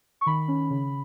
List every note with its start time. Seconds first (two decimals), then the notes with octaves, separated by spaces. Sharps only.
0.21 C#6
0.26 D#3 B5
0.48 C#4
0.71 C#3